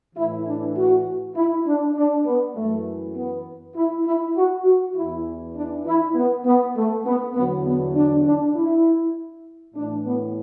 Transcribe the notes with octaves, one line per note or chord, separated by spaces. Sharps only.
A2 E3 E4
D4
F#4
E4
D4
D4
B3
F#2 E3 A3
B3
E4
E4
F#4
F#4
E2 E3 E4
D4
E4
B3
B3
A3
B3
E2 D3 F#3 B3
B3
D4
D4
E4
A2 E3 D4
B3